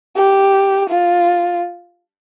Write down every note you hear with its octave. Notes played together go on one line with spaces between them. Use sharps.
G4
F4